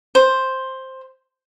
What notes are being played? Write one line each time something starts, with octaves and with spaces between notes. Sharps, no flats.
C5